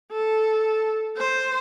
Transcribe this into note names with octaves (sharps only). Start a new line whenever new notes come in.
A4
C5